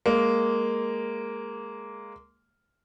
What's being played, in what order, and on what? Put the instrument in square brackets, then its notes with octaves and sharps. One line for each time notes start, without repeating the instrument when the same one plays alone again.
[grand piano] G#3 A#3